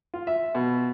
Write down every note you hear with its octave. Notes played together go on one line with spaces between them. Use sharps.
F4
E5
B2